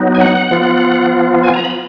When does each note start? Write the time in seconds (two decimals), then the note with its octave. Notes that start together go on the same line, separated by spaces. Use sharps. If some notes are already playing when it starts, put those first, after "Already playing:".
Already playing: F#3 B3 D#4
0.15 G#5
0.20 F#5
0.51 F3 B3 F4
1.43 G#5
1.53 A#5
1.64 B5